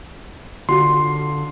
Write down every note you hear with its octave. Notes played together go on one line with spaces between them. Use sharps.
D3 F4 F#4 C6